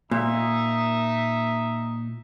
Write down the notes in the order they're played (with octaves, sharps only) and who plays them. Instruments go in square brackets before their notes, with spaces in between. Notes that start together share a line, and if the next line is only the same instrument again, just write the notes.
[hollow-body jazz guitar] A#2 [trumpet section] D#4 E5